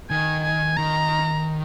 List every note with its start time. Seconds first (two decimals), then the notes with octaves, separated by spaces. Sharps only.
0.10 D#3 G#5
0.44 G#5
0.77 D#3 A#5